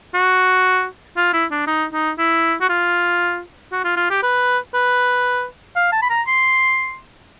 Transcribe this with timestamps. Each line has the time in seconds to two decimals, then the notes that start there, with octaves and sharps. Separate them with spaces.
0.14 F#4
1.17 F4
1.33 E4
1.51 D4
1.67 D#4
1.93 D#4
2.18 E4
2.61 F#4
2.69 F4
3.72 F#4
3.84 F4
3.97 F4
4.10 G4
4.23 B4
4.74 B4
5.75 F5
5.92 A5
6.02 B5
6.10 A#5
6.27 C6